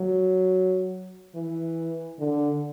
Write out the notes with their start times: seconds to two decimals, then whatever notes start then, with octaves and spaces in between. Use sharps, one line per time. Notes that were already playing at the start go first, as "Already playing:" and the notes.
Already playing: F#3
1.35 E3
2.19 D3